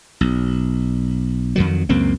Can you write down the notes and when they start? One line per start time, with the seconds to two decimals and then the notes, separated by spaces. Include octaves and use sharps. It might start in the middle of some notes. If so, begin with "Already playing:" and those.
0.21 B1
1.56 F2 D#3 F#3
1.89 C#2 F#2 A#3 C4